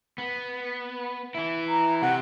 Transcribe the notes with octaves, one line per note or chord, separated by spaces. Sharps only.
B3
E3 E4
A#5
C3 F#5